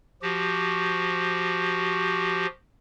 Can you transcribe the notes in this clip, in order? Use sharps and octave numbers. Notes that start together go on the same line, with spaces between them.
F3 F#4 G4